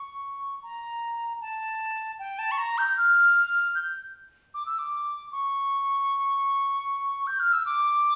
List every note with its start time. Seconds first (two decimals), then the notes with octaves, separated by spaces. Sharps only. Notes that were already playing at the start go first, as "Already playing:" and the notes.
Already playing: C#6
0.63 A#5
1.41 A5
2.19 G5
2.39 A5
2.51 C#6
2.58 A#5
2.78 G6
2.97 F6
3.75 G6
4.54 D6
4.66 E6
4.79 D6
5.32 C#6
7.27 G6
7.40 F6
7.52 E6
7.66 D6